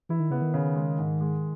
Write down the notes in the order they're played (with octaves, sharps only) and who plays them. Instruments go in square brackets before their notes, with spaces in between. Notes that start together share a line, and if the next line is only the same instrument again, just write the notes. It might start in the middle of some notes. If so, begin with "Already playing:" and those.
[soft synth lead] E3 [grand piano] E4
[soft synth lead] D#3
[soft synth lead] C#3 [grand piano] B3
[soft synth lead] D#3
[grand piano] C#3
G#3
G#2
G#3